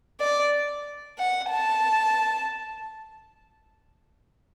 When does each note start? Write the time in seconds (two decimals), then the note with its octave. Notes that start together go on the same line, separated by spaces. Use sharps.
0.21 D5
1.19 F#5
1.51 A5